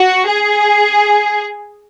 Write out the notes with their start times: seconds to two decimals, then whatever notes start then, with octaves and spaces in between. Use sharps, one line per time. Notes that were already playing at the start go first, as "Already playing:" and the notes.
Already playing: F#4
0.28 G#4